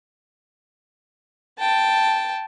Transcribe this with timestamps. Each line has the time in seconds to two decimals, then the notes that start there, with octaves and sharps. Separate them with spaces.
1.59 G5 A5